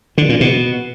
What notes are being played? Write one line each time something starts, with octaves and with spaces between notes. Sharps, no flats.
D3
A#2
B2